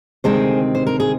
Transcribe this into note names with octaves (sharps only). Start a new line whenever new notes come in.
D2 C3 D#3 G#3 C4 G#4 C5
C5
A#4
G#4